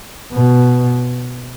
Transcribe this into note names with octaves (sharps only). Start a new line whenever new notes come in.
B2